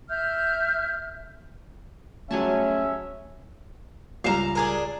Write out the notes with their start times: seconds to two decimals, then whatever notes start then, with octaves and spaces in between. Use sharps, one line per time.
0.09 E5 F6 G6
2.31 F#3 A3 C#4 G4 G#4 E5 G#5 A5
4.24 C#2 G3 F5 A#5 E7
4.55 D4 G#4 A#4